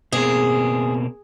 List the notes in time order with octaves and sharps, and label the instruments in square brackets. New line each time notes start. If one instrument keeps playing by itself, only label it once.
[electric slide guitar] B2 A#3 C4 [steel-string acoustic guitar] G#4